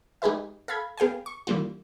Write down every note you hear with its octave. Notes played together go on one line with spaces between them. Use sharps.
G#3 D#4 G4 G#4 B4 E5
A4 F5 B5 G#6
B3 G#4 F5 G5 G#5
C#6
D#3 E3 G3 A#3 D4 F4